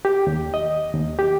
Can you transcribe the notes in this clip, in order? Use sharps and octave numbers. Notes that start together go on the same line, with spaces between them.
G4
D#2
D#5
D#2
G4